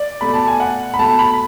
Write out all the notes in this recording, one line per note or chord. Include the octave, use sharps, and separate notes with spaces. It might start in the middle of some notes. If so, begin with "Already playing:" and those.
Already playing: D5
B2 A3 B5
A5
G#5
F#5
B5
B2 A3 A5
B5